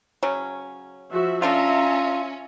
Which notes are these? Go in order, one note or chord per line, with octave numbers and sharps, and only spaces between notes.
C#3 F#3 C#4
F3 F#4 E5
A3 C#4 D4 F4 A4 E5 A#5